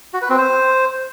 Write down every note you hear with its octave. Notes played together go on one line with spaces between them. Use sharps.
F#4
B4
C4
C5